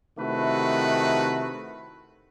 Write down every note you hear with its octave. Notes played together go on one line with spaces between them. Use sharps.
C3 D#3 A3 E4 F#4 B4